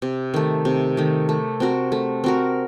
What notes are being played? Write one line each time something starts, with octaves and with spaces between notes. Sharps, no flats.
C3
D#3 A3
C3
D#3 A3
A3
C4 F#4 A#4
A3
C4 F#4 A#4